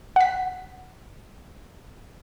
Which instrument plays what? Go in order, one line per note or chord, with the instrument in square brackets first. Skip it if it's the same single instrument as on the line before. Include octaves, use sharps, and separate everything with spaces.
[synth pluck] F#5 B6